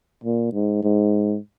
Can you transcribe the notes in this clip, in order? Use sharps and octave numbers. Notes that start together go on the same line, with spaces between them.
A#2
G#2
G#2